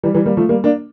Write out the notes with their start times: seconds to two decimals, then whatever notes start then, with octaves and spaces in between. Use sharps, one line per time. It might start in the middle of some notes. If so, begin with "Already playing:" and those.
0.03 E3 G3
0.14 E3 G3
0.26 G3 A#3
0.37 F3 A3
0.49 G3 A#3
0.64 A#3 D4